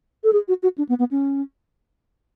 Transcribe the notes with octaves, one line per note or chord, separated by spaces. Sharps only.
A4
G#4
F#4
F#4
D4
B3
B3
C#4